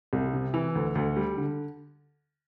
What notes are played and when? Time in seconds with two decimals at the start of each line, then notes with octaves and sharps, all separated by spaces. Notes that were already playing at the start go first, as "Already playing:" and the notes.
0.13 C2
0.34 C3
0.54 E3
0.75 D2
0.95 D2
1.17 G3
1.37 D3